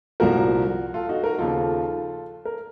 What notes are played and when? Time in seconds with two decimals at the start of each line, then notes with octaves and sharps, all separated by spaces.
0.20 C2 A#2 F3 F#4 A#4
0.94 F4 A4
1.09 D#4 F#4
1.24 F#4 A#4
1.39 D#2 C#3 F3 F4 A4
2.45 A#4